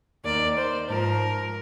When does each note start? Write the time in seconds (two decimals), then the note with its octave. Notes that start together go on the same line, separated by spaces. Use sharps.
0.24 D#2 D#3 D5
0.57 C5
0.88 G#2 F3 A#4